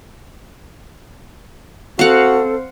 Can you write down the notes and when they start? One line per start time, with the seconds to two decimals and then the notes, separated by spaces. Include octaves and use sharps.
1.99 C4 F#4 A4 C5 F5 F#5